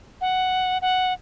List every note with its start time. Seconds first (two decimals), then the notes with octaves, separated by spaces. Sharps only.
0.21 F#5
0.82 F#5